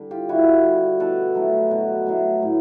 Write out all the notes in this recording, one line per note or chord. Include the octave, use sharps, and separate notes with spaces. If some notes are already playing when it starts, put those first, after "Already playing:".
Already playing: D3 G3
F4 G4
D3 E4 F#4
G3
B2 A4 B4
F#3 A3
B2
F#3 A3
A2